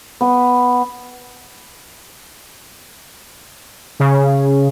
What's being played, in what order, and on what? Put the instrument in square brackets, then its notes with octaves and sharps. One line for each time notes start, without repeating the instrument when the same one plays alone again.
[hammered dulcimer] B3
[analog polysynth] C#3